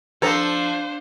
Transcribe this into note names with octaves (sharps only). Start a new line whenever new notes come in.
F3 D4 A4 C5 A#5